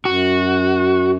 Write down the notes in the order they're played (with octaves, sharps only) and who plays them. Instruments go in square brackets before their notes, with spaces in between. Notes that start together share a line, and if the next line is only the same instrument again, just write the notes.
[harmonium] F#2 [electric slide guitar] F#4